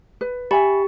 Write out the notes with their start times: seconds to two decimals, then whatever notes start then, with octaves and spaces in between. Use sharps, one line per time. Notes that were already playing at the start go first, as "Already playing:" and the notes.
0.21 B4
0.51 G4 E5 G#5 B5